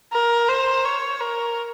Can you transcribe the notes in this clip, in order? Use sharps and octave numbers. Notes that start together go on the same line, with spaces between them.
A#4
C5
C#5
A#4